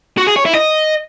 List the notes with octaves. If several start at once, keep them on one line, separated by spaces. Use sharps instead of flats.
F#4
G#4
C#5
E4
D#5